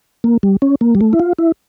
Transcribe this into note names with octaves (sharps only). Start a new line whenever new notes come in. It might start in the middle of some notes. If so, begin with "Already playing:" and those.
A#3
G3
C#4
A#3
G3
A3
E4
F4
E4